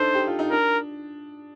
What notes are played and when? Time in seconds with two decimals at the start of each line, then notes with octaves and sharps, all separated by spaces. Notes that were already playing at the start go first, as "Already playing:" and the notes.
Already playing: D4 D#4 A4 C5
0.15 G4
0.27 F4
0.39 D#4
0.51 D4 A#4